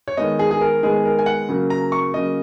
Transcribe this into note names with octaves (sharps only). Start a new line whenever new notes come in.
C#5
D#3 G#3 B3 D#5
G#4
G#4
A#4
D#3 G#3 B3 G#4
A#4
G#5
F#5
C#3 F#3 A#3
A#5
C#6
C#3 F#3 A#3 D#5